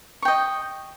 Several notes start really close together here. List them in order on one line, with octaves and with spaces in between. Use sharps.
C#6 G5 D#5